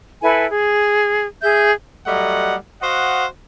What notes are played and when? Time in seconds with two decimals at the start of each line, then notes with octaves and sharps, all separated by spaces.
0.22 E4 A4 B4 G#5
0.49 G#4
1.42 G#4 E5 G6
2.06 F#3 G3 A3 D#5 F#5
2.82 F#4 C5 D#5 F5 F#5